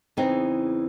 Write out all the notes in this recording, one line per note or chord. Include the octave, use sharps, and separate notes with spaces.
E2 C#3 E3 C4 D#4